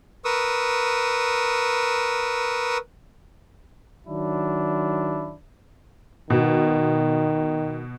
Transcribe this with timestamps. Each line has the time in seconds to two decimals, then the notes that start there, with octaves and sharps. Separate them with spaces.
0.25 A#4 B4 C#6 D#6 E6
4.07 D#3 F#3 D4 E4
6.30 B2 D#3